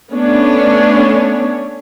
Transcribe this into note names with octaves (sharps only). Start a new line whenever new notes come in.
A3 B3 C#4 D4 C#5